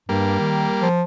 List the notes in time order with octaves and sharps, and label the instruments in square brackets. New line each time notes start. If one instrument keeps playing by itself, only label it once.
[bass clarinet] G2 [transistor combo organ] G3 A#3
[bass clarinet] D#3
F3